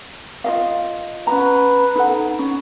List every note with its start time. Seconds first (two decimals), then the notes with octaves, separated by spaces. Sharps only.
0.44 F4 D#5 F5
1.27 C#4 B4 F#5 A#5
1.95 D#4 A4 F#5
2.39 C#4